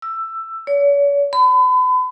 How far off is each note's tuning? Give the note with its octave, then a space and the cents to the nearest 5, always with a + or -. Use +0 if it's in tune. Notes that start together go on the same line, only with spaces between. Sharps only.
E6 +15
C#5 +40
B5 +40